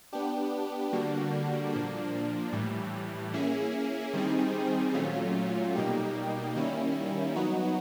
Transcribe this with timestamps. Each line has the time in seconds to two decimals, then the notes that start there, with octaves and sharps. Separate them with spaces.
0.12 B3 D4 G4
0.92 D3 G3 A#3 D4 F#4
1.72 A#2 F3 A#3 D4
2.53 A2 E3 G3
3.33 A#3 C#4 E4 G#4
4.13 D#3 G3 C4 D#4 G#4
4.94 A#2 F#3 A3 C#4 F4
5.75 B2 G3 A#3 D#4 G4
6.56 D#3 G3 A#3 C#4 E4
7.35 F#3 B3 D#4 F#4